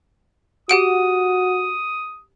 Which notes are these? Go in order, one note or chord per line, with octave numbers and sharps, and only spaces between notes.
F#4 G4 F#5 D#6 D7